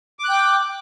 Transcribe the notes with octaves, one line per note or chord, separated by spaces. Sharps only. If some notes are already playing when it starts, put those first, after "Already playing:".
G5 D6 F#6